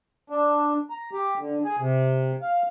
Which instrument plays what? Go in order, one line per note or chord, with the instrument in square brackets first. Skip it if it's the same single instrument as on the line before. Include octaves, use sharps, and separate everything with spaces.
[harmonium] D4
A#5
G4
D3
G#4
C3
F5